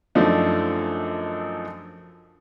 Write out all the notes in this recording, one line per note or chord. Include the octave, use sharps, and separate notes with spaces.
F#2 F3 A3 D4 D#4